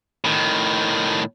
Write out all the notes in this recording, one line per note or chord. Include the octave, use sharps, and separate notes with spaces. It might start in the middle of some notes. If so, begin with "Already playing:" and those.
A2 D#3